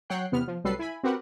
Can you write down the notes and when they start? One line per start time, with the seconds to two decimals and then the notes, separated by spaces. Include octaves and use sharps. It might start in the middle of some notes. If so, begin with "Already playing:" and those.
0.10 F#3 C#5 F#5 G5 F#6 C7
0.32 E2 C3 B3 F6
0.48 F3
0.64 C2 F#3 G3 A4 B4 C7
0.79 E4 G#5 B5
1.04 C4 F#4 G4 A#4 B4 F#5